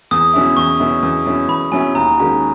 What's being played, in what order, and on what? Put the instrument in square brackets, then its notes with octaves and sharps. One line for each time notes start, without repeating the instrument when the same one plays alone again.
[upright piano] E2 [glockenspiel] D#6
[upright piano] B2 F#3 C#4 E4
[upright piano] E2 [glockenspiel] C#6
[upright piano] B2 F#3 C#4 E4
E2
B2 F#3 C#4 E4
[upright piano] E2 [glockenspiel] B5
[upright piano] B2 F#3 C#4 E4 [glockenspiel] G#5
[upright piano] D#2 [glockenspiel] A#5
[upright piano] D#3 G#3 C#4 F#4